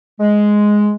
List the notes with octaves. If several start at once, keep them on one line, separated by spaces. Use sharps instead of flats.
G#3